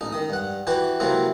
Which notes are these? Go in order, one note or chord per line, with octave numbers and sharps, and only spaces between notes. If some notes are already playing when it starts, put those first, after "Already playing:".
A1 D#4
D#3 D#6
G2 F#5
E3 F#4 G4 B4
C3 E3 F#3 A#3 C4